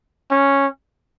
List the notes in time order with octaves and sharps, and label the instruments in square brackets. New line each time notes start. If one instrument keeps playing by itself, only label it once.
[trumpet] C#4